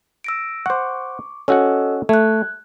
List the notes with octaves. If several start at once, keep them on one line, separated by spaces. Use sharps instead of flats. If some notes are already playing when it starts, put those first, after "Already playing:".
E6 A#6 D7
C5 F#5 C#6 D6
C#4 F#4 A4 D#5 F#5 E6
A3 F#6 G#6